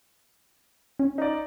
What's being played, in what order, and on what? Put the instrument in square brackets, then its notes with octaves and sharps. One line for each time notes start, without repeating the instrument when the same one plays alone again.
[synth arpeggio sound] C#4
[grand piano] D#4 D5